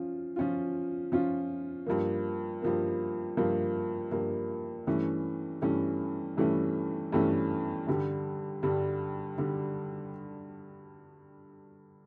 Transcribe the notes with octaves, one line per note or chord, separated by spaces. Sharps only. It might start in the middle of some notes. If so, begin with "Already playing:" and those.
Already playing: F3 C#4 F4
F3 C#4 F4
F3 C#4 F4
G2 F3 A#3
G2 F3 A#3
G2 F3 A#3
G2 F3 A#3
G2 E3 A3 C#4
G2 E3 A3 C#4
G2 E3 A3 C#4
G2 E3 A3 C#4
G2 D3 G3
G2 D3 G3
D3 G3